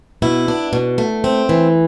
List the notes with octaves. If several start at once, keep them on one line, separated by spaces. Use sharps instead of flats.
B2 E4
D4
B2
A3
C4
E3